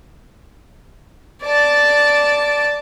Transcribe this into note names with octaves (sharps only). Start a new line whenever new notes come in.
D5 A5